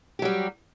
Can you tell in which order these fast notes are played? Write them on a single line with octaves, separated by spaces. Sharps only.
G4 F#3 G3